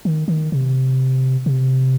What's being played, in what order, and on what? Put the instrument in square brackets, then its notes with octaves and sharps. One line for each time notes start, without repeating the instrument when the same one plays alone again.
[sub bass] D#3
D#3
C3
C3